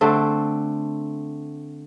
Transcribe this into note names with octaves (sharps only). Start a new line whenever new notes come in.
D3 A3 C4